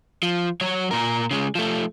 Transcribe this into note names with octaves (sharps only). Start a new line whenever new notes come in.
F3
F#3 C#5
A#2 A#4
C#3 G#3
F3 A3